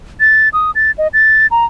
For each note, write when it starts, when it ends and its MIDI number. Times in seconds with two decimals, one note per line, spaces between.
0.20 0.49 93
0.53 0.71 87
0.75 0.91 93
0.98 1.08 75
1.13 1.47 93
1.51 1.65 82